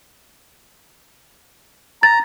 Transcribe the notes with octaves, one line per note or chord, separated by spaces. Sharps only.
A#5 A6